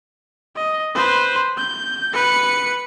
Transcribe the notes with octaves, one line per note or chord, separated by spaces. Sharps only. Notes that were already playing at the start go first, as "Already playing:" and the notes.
D#5
B4 C5
G6
B4 C#7